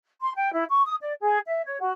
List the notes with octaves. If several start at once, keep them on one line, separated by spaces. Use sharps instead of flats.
C6
G5
E4
C#6
D#6
D5
G#4
E5
C#5
F#4